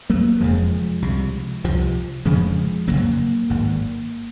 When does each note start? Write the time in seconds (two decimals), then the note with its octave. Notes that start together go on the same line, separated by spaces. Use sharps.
0.10 F#3 A#3
0.41 F1 F2 C#3 F3 G#3
1.02 C2 C3
1.64 C2 C3 F3
2.26 F1 F2 C#3 F3 G#3
2.88 F1 F2 C#3 F#3 A#3
3.50 G#1 G#2